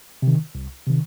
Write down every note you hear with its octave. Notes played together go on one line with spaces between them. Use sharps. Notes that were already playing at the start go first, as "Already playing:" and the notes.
C3 D#3
C2
C3 D#3